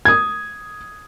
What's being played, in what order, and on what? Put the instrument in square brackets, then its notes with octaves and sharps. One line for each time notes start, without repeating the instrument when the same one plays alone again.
[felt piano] D#6 G#6